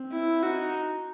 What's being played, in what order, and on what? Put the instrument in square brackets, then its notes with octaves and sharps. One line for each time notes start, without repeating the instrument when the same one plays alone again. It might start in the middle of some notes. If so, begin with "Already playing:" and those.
Already playing: [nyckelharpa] C4
[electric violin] E4
[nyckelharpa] D#4 [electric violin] F#4